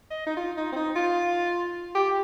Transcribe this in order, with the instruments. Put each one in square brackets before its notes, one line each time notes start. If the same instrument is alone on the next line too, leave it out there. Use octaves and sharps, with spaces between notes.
[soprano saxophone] D#5
D#4
F4
D#4
C4
D#4
F4
G4